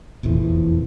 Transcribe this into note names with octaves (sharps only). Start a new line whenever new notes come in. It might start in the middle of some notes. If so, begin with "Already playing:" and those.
E1 A#1 F2 E3